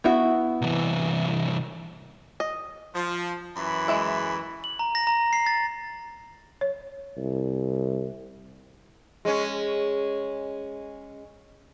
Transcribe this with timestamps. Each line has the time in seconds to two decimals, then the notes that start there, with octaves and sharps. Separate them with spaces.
0.04 B3 E4 F#4
0.62 C2 E3
2.40 D#5
2.95 F3
3.57 F#2 E3 B5
3.88 G#3 E4 E5
4.64 F#7
4.79 A#5
4.95 A#6
5.07 A#5
5.33 C7
5.46 A6
6.61 C#5
7.17 C2
9.25 G#3 C#4